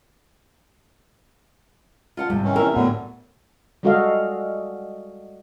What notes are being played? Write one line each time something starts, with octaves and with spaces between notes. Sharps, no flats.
F4 F#5 A5
G#2 C3 G3
D#3 E3 C#4
C4 E4 A#4 E5
A2 D3 F#3 G3 B3
G3 G#3 F#4 A4 D#5 F5